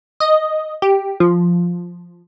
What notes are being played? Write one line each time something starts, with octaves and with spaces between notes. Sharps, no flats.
D#5
G4
F3